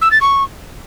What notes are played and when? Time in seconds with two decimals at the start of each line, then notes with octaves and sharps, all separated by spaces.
0.01 E6
0.11 A6
0.21 C#6